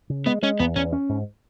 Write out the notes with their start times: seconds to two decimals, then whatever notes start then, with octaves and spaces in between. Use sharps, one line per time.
0.10 C#3
0.26 G#3 B3
0.43 G#3 C#4
0.60 E2 B3
0.76 E2 C#4
0.93 C#4
1.09 G#2